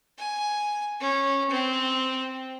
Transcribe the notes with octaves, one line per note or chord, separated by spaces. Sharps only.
G#5
C#4
C4